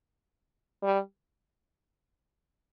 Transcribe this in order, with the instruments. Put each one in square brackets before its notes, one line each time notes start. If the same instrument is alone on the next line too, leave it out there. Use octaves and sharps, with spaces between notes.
[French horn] G3